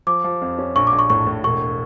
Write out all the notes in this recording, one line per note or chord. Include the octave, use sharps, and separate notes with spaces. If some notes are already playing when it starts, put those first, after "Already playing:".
F3 D6
F3
F2
C#4
A#1 C#6
D6
A#1
C#6
A2 C#6
A2
E1 C#6